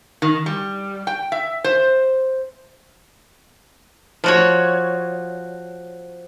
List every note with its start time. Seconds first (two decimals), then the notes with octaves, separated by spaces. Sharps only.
0.22 D#3
0.46 G3
1.07 G5
1.32 E5
1.64 C5
4.24 F3 F#4 C#5